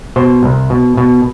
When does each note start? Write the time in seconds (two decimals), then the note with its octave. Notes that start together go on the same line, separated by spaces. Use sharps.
0.16 B2 C5
0.43 C2
0.70 B2
0.97 B2